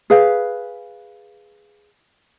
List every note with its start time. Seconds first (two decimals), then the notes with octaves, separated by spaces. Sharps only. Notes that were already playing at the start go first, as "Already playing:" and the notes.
0.10 G#4 B4 F5